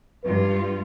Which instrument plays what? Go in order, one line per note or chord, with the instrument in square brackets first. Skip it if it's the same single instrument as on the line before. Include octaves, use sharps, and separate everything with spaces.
[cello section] G2 F4 [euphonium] B4